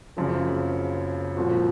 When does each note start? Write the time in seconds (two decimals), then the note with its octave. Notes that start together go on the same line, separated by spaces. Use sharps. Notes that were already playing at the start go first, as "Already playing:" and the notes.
0.17 F#1 F#2 C#3 F3 C4
1.36 C2 A#2 F3 C4 F#4